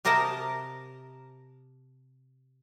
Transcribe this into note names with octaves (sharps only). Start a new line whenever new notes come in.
C3 G4 A#4 D#5 A5 A#5